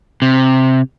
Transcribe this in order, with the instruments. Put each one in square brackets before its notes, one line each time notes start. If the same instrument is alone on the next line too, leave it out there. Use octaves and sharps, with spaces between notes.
[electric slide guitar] C3